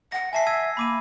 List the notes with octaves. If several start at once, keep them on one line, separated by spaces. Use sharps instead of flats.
F#5 A#6
E5 G#5 A5 C7
E6 G#6 D#7
A#3 B5 D6 D#7